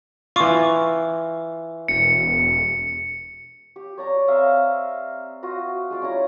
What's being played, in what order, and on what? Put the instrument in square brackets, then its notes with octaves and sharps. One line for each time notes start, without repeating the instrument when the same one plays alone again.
[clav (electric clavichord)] E3 F4 [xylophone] C#6 D6
[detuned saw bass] E1 [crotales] C#7
[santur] G4
C#5 D5 A#5
C4 E5 F5 A#5
F4 F#4 D#5
G#3 F4 D5
C#4 E4 A#5